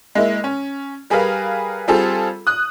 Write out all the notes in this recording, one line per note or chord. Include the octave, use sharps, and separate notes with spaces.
G#3 A#3 E4
C#4
G3 G#4 A#4 B4 F5
G3 C4 F4 G#4 A4
D#6 F#6